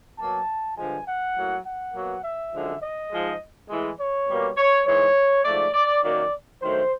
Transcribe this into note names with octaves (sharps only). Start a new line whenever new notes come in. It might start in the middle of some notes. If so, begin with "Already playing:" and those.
B2 F#3 A#3 A5
G2 D3 F3 G#3 G#5
F#5
A2 F#3 A#3
F#5
B2 F#3 A#3
E5
F#2 D3 F3 G#3
D#5
G#2 F3 G#3
A2 E3 G#3
C#5
B2 G3 A#3
C#5
G#2 E3 G#3 C#5
G#2 F3 A3 D5
D5
F#2 D#3 F#3 A#3 D5
G2 D#3 F#3 A3 C5